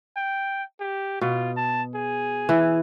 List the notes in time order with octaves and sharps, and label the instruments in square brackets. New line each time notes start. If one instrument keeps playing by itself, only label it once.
[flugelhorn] G5
G4
[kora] B2 [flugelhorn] F4
[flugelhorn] A5
G#4
[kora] E3